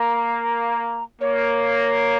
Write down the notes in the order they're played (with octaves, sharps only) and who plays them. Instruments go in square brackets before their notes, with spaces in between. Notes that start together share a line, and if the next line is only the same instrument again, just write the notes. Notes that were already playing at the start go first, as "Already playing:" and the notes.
Already playing: [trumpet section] A#3 [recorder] A#5
[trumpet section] A#3 [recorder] C#5